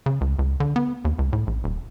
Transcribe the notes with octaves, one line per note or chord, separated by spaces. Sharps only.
C#3
C#2
C#2
D3
B3
D#2
C#2
A2
A#1
D#1